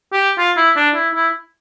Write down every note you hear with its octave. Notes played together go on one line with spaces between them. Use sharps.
G4
F4
E4
D4
E4
E4